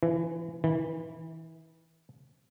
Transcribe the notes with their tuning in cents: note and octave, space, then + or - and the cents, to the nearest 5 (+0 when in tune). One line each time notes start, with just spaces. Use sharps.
E3 +20
E3 -25